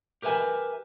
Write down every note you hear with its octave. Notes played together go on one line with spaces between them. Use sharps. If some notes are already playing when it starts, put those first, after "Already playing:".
G4 A#4 B4 E5 G#5